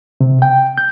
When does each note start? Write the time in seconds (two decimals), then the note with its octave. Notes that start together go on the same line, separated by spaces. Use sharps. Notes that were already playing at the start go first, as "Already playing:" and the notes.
0.21 C3
0.42 G5
0.78 G6